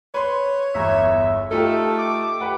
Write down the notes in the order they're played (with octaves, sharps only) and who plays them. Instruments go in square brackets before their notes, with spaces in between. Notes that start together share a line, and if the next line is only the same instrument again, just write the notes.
[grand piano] B4 C6 [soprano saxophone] C#5
[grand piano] G1 E2 A#5 [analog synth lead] E5
[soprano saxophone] A3 [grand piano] D#4 F4 G4 [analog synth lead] A4
[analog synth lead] D6
[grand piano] G4 B4 F#5